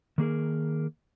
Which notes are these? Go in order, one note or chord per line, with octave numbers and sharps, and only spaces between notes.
D#3 A#3 G#4 A#4